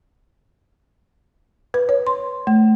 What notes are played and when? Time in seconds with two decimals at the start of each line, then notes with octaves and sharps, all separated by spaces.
1.74 B4
1.89 C#5
2.07 C6
2.47 A3